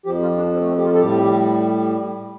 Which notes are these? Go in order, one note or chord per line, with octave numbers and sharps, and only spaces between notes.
F2 F3 G4
F4
D4
C4
A3
C4
G4
F4
A4
A2 G3 G4